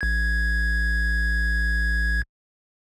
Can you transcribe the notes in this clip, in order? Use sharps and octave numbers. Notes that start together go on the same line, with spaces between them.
A1 G#6